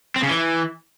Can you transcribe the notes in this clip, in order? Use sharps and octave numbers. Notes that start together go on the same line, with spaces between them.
C4
C#3
E3